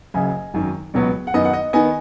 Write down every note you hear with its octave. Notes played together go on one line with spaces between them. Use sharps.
F#1 F#2 C#3 D#5 G#5
G#1 F#2 D#3
C#2 B2 F#3 B3
F#5
F#2 D#3 B3 D#5
F#5
D#5
D#3 B3 D#5 G#5